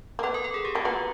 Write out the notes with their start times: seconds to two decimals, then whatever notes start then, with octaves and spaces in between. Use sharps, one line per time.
0.19 A#3
0.23 B3 A4
0.34 A#4
0.44 A4
0.54 G#4
0.65 G4
0.75 A#3 F#4
0.85 B3 F4